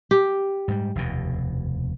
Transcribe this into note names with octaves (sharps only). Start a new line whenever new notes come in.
G4
G#2 G3
F1 D#2 B2